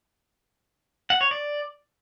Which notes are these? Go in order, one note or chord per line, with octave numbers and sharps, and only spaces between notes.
F#5
C#5
D5